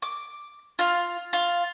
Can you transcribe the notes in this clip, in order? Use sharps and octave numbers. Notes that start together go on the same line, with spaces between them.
D6
F4 F5
F4